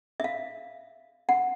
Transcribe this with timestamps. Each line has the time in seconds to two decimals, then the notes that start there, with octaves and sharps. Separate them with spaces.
0.20 E5
0.24 F5
1.29 F#5